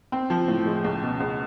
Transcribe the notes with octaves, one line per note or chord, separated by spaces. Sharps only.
C4
F3
A2
G#3
C#2
B2
C#2